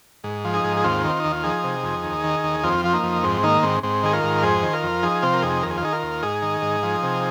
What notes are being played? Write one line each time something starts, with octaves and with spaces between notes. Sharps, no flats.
G#2
F3
D#4 G#4
G#2
G#4
D#2 C4 F4
D#3 C4
D#2 D#4
F4
F3 D#4 G#4
C3
F2
D#2
D#3
D#2
F2 C4 F4
F3 F4
A#3 D#4
F2
G#2 C4
D#3 A#3 D#4
G#2 C4
G#2 C4
D#3 G#4
F4 A#4
G#2
F2 G#4 C5
D#3
F4 A#4
F2
F3 D#4 G#4
C3 C4 F4
A#4
F2 D#4 G#4
D#2 A#4
G#4
F4
D#3 D#4 G#4
F4 A#4
D#2
G#2 D#4 G#4
D#3
G#2
F3
C3